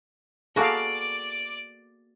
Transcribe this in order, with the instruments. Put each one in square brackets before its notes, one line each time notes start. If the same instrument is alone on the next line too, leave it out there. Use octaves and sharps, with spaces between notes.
[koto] A#3 B3 F#4 [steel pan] G#4 A4 F5 [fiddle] D5 D6